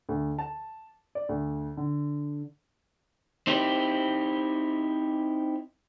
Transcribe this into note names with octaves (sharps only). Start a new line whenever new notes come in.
D2
A5
D5
D2
D3
C4 D#4 E4 G4